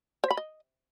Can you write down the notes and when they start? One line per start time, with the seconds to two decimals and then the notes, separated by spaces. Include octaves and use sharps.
0.24 C5
0.31 B5
0.37 D#5